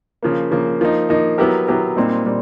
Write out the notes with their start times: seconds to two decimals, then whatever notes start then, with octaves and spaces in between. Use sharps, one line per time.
0.23 C#3 F3 A#3
0.51 C#3 F3 A#3
0.81 F3 A#3 D#4
1.09 F3 A#3 D#4
1.38 F#3 B3 E4 G4 A#4
1.68 F#3 B3 E4 G4 A#4
1.96 A#2 G3 C4 D#4
2.25 A#2 G3